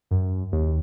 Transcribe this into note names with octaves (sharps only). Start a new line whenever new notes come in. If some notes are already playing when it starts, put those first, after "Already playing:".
F#2
D#2